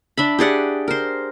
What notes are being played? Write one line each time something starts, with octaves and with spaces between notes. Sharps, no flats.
D4 E5 B5
G4 G#4 D5 F#5
A#4 C5